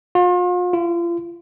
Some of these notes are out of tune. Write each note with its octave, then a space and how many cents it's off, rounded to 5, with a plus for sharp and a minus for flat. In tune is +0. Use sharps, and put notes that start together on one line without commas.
F4 +40
F4 -35